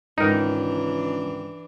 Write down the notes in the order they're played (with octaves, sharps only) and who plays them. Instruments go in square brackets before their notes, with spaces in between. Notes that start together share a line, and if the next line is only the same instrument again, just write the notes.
[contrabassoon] C#2 [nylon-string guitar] G#2 D#3 [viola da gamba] E3 D4 [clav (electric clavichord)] D#4 A#4